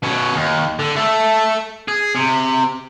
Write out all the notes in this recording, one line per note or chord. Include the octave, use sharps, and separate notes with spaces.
B2 C#4
D#2
D3
A3 A4
G#4
C3